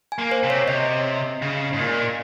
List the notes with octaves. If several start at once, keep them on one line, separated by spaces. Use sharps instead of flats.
G#5
A#3
C5
C3
C#5
C3 D#5
C#3
G#2
A#2